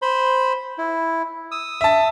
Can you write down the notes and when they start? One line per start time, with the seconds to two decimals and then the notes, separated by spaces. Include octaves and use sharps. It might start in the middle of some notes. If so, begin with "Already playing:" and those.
0.02 C5 B5 C6
0.78 E4
1.51 D#6 E6
1.81 E5 A5